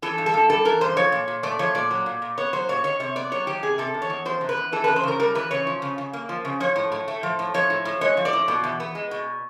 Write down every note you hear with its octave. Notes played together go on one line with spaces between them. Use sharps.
E3 A4
G2
A4
G2
G3 A4
E3 A#4
G2 C5
F3 C#5
A#2
A#2
A3 D5
F3 C#5
A#2 D5
F#3
A#2
A#2
B3 C#5
F#3 C5
A#2 C#5
D#3 C#5
C3 C#5
B3 D5
F#3 C#5
D#3 G4
C3 G#4
C3 A4
E2
C#5
E2
F3 C5
C3
B4
E2
E3 A4
C#3 B4
C5
C#3 A#4
G3 A#4
E3 B4
C#3 C#5
F3
C#3
C#3
A#3
F3
C#3
F3 C#5
A2
A2
A3
F3
A2
F3 C#5
A2
A2
G#3 C#5
F3
D5
A2
B2
E2
B3
G#3
B2